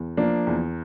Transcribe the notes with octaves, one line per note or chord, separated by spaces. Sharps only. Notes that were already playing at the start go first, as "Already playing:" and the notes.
Already playing: E2
F3 A#3 D4
E2